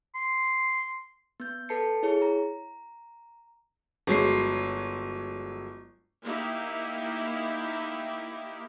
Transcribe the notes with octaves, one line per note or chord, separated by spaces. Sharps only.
C6
B3 G6
A4 B4 A5 C7 C#7
E4 G#4 C#5
A#5
G1 F#3 G#3 C7
A#3 D#4 E4 G4